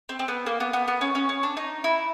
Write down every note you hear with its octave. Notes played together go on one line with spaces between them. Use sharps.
C4
C4
B3
A#3
B3
B3
B3
C#4
C#4
C#4
D4
D#4
E4